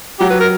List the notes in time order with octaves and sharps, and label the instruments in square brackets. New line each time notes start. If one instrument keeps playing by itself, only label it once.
[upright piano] F#3 F#4 [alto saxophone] G4
[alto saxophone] B4
A#4